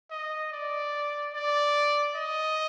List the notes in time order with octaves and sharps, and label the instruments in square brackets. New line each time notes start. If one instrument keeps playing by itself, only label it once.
[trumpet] D#5
D5
D5
D#5